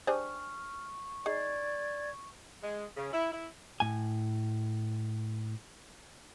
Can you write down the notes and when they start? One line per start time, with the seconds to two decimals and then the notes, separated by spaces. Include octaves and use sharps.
0.07 D4 G4 G#4 C5 G#5 C#6 F6
1.26 D#4 G#4 D5 G#6 C7
2.62 G#3
2.97 C#3
3.12 E4
3.32 E4
3.80 A2 G#5